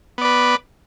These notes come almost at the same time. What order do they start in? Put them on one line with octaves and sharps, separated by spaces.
B3 D5 B4